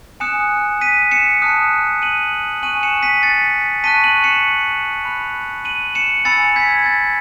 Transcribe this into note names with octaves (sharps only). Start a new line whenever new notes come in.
G#5 D#6 F#6 C#7 E7
B6 D#7
C#7 E7
A5 D#6 F#6
D#7 F#7
G#5 C#6 F#6 D#7 F#7
C#7 E7
B6 D#7
A6 C#7
A5 C#6 F#6 B6 D#7
D#7 F#7
C#7 E7
B5 F#6
D#7 F#7
C#7 E7
G#5 B5 E6 A6 C#7
G#6 B6
A6